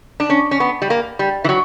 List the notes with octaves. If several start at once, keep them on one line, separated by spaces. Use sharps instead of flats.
D4
C#4
C#4
B3
G3
A#3
G3
E3
F#3